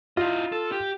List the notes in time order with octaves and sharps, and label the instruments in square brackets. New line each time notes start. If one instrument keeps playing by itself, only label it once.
[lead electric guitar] E4 D#5 [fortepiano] F4
[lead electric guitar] A4
G4